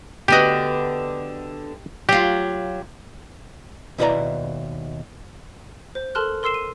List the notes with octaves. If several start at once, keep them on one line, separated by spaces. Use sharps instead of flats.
D3 B3 F#4 G4 D#5
F#3 F4 G4
D#2 B2 E4 B4 D5 A#5
C5
A4 A#4 A5 C6 F6 F#6
A#4 C6 E6 C7 E7
D#7